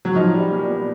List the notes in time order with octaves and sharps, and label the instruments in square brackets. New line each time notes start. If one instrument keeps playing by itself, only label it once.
[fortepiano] F#3
[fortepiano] F3 [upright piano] D#4
[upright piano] G3
A#2
B3